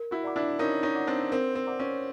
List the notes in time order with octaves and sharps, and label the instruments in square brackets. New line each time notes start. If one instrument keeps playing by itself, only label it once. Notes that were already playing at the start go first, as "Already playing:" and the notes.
Already playing: [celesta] A#4
[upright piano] E4 F#4
[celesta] D5 F#5 A#5 D6
[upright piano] D4 E4
[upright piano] C#4 D#4 [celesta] A#4
[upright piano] C#4 D#4
[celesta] D5 F#5 A#5 D6
[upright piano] C4 D4
[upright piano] C4 [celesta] A#4
[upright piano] C4
[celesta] D5 F#5 A#5 D6
[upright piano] C#4